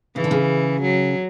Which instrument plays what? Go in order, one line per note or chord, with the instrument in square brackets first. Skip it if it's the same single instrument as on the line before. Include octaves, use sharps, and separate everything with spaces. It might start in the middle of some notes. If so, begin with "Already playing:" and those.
[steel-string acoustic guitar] C#3 [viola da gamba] E3
[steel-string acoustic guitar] D3
C#3
[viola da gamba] F#3